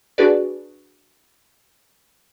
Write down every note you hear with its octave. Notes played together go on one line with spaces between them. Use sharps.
D4 F#4 G#4 B4 D5